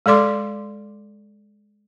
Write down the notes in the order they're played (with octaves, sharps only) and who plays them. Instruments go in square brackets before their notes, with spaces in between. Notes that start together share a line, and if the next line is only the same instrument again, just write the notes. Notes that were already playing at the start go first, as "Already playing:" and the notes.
[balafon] G#3 A4 D5 C6 D6